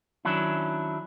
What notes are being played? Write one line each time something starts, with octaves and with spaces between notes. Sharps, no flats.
D#3 F#3 C#4 D4 E4